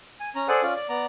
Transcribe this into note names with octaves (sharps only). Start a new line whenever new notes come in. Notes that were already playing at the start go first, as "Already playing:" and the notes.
G#5
C#4 A#5
G#4 A4 C5 D5 F#5 G#5
C#4 F4 D5
D5
B3 D5 A#5